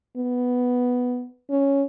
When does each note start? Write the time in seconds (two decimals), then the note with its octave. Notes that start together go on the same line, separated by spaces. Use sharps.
0.17 B3
1.50 C#4